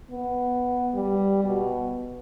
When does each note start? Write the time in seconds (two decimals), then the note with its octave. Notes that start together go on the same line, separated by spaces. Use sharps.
0.11 B3
0.94 G3
1.44 B2